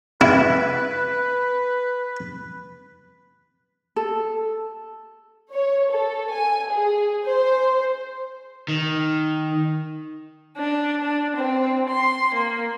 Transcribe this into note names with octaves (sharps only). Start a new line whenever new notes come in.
E4 B4
A4
C#5
A4
G#5
G#4
C5
D#3
D4
D4
C4
C6
A#3